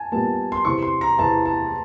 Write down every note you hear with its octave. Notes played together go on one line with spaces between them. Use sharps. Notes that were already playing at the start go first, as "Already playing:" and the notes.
Already playing: G#5 A5
A#2 G3 B3 A5
C6
E2 C3 E3 C#6
C6
A#5
E2 C3 E3 A5
A5